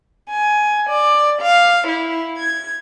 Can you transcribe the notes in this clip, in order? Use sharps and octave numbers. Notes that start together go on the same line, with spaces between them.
G#5
D5
F5
E4
G#6